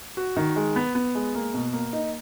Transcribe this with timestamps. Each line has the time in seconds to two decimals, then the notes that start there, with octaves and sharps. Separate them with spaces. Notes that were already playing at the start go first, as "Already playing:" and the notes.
0.17 F#4
0.37 D#3
0.56 G#3
0.76 B3
0.95 B3
1.15 G#3
1.35 A#3
1.54 B2
1.73 A#3
1.93 D#4